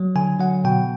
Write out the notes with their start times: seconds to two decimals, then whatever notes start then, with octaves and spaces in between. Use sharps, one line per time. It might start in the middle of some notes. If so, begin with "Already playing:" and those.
Already playing: F#3
0.16 D3 G#5
0.40 F#3 F#5
0.64 B2 G5